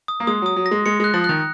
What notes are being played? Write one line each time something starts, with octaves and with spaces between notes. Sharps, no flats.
D#6
A#3
G#3 D#6
F#3 D#6
F#3
A#6
G#3
G#3 C#7
G#3 F#6
F3
D#3 F#6